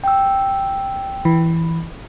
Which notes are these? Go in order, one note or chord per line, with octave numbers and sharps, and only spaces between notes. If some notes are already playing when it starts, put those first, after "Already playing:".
G5 E6
E3